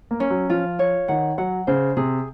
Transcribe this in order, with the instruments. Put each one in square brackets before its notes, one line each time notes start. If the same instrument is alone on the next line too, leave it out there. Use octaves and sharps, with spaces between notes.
[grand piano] A#3
[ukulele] C#4
[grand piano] F#3
[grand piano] F3 [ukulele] F4
[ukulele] C#5
[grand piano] D#3 [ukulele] F#5
[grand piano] F#3 [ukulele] F#5
[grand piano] C#3 [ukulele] C5
[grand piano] C3 [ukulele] G#4